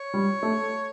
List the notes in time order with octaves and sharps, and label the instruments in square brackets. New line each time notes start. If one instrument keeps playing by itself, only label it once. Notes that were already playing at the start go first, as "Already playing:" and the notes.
Already playing: [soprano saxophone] C#5
[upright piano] G3
A3